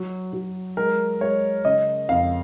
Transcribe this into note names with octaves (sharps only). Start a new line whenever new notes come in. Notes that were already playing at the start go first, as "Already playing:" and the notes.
Already playing: F#3
F#3
G#3 A#4
G#3 C#5
C#3 D#5
F2 F5